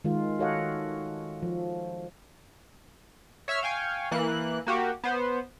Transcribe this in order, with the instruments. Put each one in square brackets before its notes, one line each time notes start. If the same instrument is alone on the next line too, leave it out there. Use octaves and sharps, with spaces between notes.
[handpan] D#3 G#3 F4
F#4 A4 C#5 D#5 F5 F#5
F3
[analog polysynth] C#5 E5 E6 F6
F5 G5 G#5 C#6
E3 A#3 F#6
A#3 F#4 G4
B3 C5